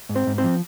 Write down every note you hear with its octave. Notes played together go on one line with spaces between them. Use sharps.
G#2
C4 C5
G#2
C4 C5
F3